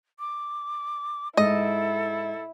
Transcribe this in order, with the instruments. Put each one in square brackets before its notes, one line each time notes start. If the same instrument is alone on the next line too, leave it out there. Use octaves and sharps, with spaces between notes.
[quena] D6
[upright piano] G#2 [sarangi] E4 [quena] A4 [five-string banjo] D#5